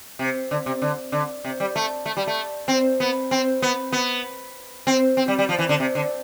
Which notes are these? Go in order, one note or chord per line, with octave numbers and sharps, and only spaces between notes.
C3
D3
C3
D3
D3
C3
G3
A3
A3
G3
A3
C4
B3
C4
B3
B3
C4
C4
G3
G3
F3
E3
D3
C3
D3